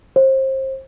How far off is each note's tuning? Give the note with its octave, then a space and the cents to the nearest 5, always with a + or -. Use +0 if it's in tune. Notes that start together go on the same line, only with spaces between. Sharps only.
C5 +30